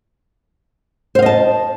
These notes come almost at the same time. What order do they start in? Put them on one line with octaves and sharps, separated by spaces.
C5 F5 D#5 A5